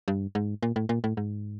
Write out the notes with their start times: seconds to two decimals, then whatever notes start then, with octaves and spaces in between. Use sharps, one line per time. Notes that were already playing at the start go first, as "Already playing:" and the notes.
0.08 G2
0.35 G#2
0.63 A#2
0.76 A2
0.89 A#2
1.04 A2
1.17 G#2